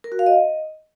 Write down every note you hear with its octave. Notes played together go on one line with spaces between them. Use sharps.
A#4
F#4
F5
D#5